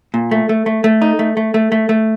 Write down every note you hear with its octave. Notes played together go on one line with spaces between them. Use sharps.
A#2
A3
A3
A3
A3
D#4
A3
A3
A3
A3
A3